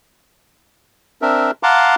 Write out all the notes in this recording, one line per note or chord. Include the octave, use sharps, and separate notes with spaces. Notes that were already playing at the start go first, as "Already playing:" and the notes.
C4 D4 A#4 E5
F5 F#5 A5 A#5 C6 D6